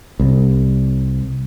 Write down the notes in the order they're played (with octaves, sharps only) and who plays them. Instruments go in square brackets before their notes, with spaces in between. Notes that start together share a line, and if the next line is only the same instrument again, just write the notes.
[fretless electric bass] C2